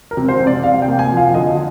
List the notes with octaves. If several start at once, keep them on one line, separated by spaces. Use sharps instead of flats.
A#4
C3
C5
C3
D5
C3 F5
G5
A#3
G#5
F3
F5
D3 D#5